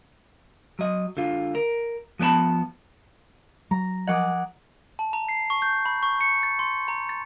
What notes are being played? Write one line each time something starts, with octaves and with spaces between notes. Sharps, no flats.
F#3 D#5
D3 F4
A#4
F3 B3 B4 A5 B5
F#3 A#5
F3 D#5 F#5 D6 D#6
A5
A#5
C7
C#6
G6
B5
C#6
C#7
A6
C6
A#5
A6